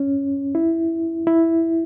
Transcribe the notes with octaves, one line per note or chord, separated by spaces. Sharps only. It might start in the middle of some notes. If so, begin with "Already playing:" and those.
Already playing: C#4
E4
E4